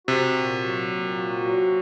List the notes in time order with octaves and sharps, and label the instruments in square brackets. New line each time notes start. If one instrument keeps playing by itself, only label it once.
[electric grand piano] C3 [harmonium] F#4
[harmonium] A#2
F#3
A#2
F#4
F#3